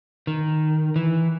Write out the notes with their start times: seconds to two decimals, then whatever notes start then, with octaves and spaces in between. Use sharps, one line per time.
0.27 D#3
0.96 E3